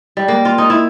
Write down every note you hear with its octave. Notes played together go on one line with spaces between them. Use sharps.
G3
A#3
F4
D#4
E4